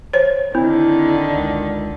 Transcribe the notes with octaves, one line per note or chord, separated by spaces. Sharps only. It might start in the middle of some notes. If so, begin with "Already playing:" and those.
C5 C#5
D3 D#3 C4 E4
C#2